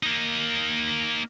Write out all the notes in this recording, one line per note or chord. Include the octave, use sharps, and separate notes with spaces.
A#3 D#4